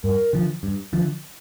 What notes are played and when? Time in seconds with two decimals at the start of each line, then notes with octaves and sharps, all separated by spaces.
0.04 G2 A#4
0.33 D3 F3
0.63 G2
0.93 D3 F3